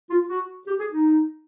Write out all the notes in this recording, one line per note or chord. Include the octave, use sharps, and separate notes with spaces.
F4
F#4
G4
G#4
D#4